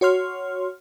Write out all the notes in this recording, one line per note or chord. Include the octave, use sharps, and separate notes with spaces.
F#4 C#5 C6 F6